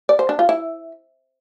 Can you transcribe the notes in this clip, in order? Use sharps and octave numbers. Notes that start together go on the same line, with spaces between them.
D5
C5
D4
F4
E4